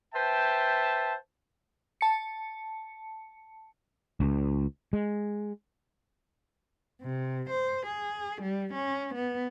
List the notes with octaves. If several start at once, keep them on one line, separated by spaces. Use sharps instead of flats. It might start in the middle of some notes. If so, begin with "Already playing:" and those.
B4 C5 E5 G5 A5
A5 C#7
C#2
G#3
C3
C5
G#4
G3
C#4
B3